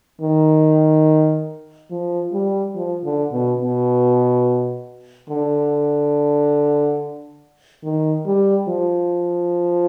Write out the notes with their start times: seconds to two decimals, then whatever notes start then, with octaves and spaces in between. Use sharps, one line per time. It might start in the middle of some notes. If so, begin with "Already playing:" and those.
0.21 D#3
1.91 F3
2.33 G3
2.75 F3
3.04 D3
3.32 B2
3.60 B2
5.30 D3
7.84 D#3
8.26 G3
8.68 F3